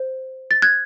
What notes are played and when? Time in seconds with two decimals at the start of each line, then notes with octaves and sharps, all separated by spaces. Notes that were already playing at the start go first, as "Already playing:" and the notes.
Already playing: C5
0.51 A6
0.62 F#6 G#6